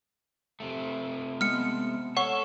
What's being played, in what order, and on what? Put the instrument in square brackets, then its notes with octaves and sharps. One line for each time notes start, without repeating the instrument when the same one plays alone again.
[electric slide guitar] C3 A3
[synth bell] G#3 B3 [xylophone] F6 C#7
[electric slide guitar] A4 [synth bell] C#5 [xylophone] F#5 C#6